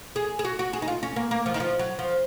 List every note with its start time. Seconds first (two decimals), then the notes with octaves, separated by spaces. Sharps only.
0.16 G#4
0.39 G#4
0.45 F#4
0.59 F#4
0.73 G#4
0.82 D#4
0.88 F4
1.03 C#4
1.16 A#3
1.31 A#3
1.46 F3
1.54 D#3
1.60 F3
1.79 F#3
1.99 F3